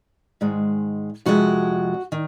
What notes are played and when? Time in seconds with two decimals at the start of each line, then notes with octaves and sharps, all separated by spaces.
0.41 G#2 D#3 G#3
1.26 F2 C3 F3 G#3 F#4
2.12 D#3